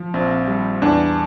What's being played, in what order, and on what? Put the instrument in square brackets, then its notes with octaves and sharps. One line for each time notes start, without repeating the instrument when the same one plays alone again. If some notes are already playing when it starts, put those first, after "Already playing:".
Already playing: [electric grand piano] F3
A#1 C4
G3
E2 D4